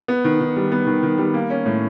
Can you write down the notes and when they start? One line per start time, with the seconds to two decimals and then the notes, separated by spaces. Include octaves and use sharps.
0.08 B3
0.25 D#3
0.41 D#3
0.56 G3
0.72 B3
0.87 D#3
1.03 D#3
1.18 G3
1.34 A#3
1.50 C#4
1.66 A2